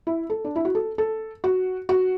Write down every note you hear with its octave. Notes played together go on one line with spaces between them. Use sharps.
E4
A4
D4
E4
F#4
A4
A4
F#4
F#4